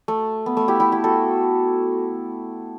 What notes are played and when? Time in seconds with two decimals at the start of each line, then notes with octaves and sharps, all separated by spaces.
0.08 A3
0.46 B3
0.57 A3
0.68 E4 G4
0.80 E4 G4
0.92 E4 G4
1.04 F#4 A4